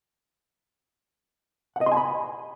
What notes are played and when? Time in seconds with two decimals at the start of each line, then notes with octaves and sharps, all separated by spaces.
1.76 F#5
1.81 D#5
1.86 C6
1.92 G#5
1.97 B5